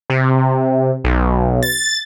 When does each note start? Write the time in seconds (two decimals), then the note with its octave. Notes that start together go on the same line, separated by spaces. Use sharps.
0.10 C3
1.04 B1
1.63 A6